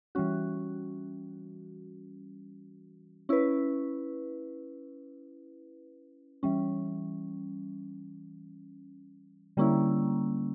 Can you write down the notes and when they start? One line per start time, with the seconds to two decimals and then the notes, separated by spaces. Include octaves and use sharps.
0.15 E3 G3 C#4 F#4
3.29 C#4 E4 B4
6.43 E3 G3 C#4
9.57 D3 G3 A#3 C#4 E4